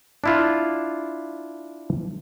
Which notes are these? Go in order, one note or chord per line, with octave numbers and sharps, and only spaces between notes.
D4 E4 F4